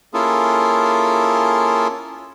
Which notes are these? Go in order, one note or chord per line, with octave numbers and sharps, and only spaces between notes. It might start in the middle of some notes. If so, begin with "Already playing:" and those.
A#3 C#4 E4 F4 G#4 A4